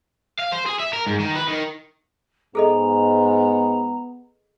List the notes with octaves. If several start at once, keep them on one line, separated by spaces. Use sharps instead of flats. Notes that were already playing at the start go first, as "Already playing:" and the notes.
F5
C5
G#4
E5
A#4
G#2
D#3
B4
D#3
G#2 B3 G#4 A4 D#5 A#5